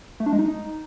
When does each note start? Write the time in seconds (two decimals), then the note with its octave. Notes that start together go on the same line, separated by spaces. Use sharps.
0.20 A3
0.26 D4
0.33 G#3
0.39 D#4